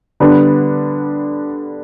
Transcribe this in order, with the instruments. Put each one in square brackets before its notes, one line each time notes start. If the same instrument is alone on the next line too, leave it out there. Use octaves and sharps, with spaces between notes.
[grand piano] D3 G3 B3 D4